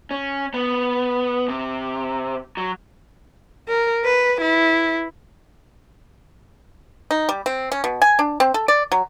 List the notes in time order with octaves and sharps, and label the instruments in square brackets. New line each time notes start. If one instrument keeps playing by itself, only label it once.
[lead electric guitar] C#4
B3
C3
F#3
[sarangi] A#4
B4
E4
[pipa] D#4
G3
C4
C#4
B2
G#5
D4
C4
A4
D5
F#3